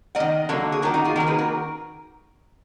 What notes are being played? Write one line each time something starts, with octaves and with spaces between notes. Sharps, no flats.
A#3 D#5 F#5
D#3
D3 F#3 A#3
G#4
D#3 A#3 F#4 A#4
D#4 F#4
F4 G#4
D#3 A#3 F#4 A#4
G#4 B4
F#4 A#4